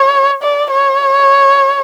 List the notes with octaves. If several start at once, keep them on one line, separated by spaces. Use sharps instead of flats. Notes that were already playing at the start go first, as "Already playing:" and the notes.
Already playing: C#5
D5
C#5